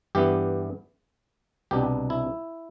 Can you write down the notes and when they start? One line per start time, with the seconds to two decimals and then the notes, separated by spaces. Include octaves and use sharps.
0.15 G2 E3 B3 G4
1.71 C2 B2 B3 D4 G4
2.10 E4